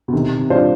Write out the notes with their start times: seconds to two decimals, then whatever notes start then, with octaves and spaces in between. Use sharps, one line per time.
0.08 B2
0.13 C3 D#3
0.37 C3
0.50 G3 D4 F4 C5